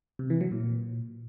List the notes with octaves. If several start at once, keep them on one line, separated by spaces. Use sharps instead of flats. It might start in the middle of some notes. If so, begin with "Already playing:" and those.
C3
E3
F#3
A#2